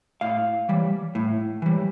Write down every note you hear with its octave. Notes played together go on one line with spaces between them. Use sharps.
A2 F5
E3 G3
A2
E3 G3